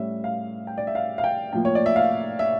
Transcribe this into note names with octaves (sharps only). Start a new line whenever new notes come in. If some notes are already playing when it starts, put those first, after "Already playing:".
Already playing: A2 G3 C#4 E5
F5
G5
D5
E5
F5
F5
G5
A2 F3 A#3 G5
C#5
D5
E5
F5
E5